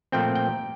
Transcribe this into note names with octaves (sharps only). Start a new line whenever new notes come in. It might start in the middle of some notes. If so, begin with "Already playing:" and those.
A#2 F3 A3 C4 G5
G5